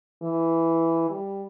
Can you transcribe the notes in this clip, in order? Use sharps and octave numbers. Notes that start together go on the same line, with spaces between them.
E3
G3